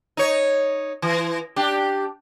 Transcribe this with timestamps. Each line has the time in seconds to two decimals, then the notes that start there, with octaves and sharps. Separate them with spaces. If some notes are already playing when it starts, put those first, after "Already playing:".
0.17 D#4 C#5
1.02 E3
1.56 D4 G4